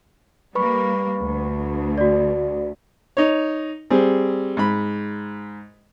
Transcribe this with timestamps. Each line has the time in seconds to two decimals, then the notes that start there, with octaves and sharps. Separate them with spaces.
0.55 G3 A#3 B4 B5 C#6
1.20 D2
1.98 F#4 D5
3.17 D#4 C#5
3.90 G3 C4 G#4
4.57 G#2 B5